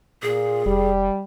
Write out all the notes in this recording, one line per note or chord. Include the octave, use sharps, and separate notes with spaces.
A#2 G#4
F1 G3